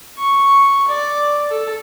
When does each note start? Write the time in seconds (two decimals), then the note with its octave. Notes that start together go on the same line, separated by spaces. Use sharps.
0.18 C#6
0.88 D5
1.50 A4